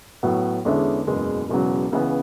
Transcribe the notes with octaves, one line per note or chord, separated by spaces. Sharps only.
A2 F#3 B3
E2 D3 G#3 C#4 E4
F#1 E2 B2 G#3
E1 E2 C#3 F#3
C#2 C#3 E3 B3